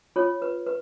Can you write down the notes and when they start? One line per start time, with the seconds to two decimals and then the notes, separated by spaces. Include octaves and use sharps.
0.16 F4 C#5
0.42 B4
0.67 B4